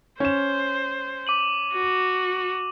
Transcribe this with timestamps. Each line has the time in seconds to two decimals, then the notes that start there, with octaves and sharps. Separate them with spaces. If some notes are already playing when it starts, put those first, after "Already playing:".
0.20 C#4 C5 E7
1.27 D6 D#7 F#7
1.73 F#4